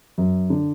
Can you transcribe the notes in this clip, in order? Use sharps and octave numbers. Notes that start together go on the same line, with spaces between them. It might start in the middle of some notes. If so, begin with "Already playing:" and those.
F#2
D3